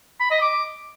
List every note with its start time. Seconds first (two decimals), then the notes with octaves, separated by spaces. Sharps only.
0.20 B5
0.31 D#5
0.41 D6